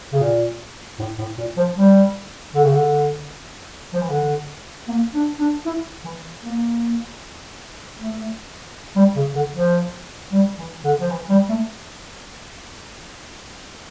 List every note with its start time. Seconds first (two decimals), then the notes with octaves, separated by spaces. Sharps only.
0.12 C#3
0.21 A#2
0.99 A2
1.18 A2
1.38 A#2
1.57 F3
1.76 G3
2.54 D3
2.64 C#3
2.73 D3
3.93 F3
4.01 E3
4.10 D3
4.88 A#3
5.14 D4
5.39 D4
5.65 E4
6.04 E3
6.43 A#3
7.98 A3
8.96 G3
9.15 C#3
9.35 D3
9.54 F3
10.32 G3
10.58 E3
10.84 D3
11.00 F3
11.10 E3
11.29 G3
11.49 A3